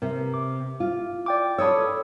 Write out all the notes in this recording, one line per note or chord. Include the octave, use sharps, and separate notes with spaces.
C3 A#4
D6
F4
D5 G5 D6
F4 A4 C#5 B5 D#6 E6